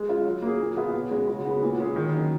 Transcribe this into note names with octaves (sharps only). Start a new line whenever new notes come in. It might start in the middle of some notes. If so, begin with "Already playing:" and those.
Already playing: G#3
C#4 F4
F#3
A#3 C#4 G#4
A#2
F#3 B3 F4 G#4
B2
G#3 C#4 F#4
C#3
G#3 B3 F#4
A#2
G#3 C#4 G#4
D#3
F#3 C#4